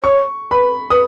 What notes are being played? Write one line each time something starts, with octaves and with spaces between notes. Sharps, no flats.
C#5 C#6
B4 B5
B4 D#6